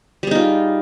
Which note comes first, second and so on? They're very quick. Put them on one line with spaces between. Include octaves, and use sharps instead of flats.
G3 G#4 D#4 F4